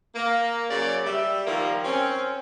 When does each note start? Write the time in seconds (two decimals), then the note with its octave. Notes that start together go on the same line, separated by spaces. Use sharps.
0.15 A#3
0.70 C#3 F#3 D5
1.06 G3 E5
1.47 D#3 F3 G3 A#3
1.85 C4 C#4